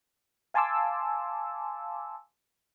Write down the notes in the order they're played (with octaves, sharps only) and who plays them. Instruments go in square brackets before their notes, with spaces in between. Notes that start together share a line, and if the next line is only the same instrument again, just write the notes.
[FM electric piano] F5 G#5 A5 C6 D6 E6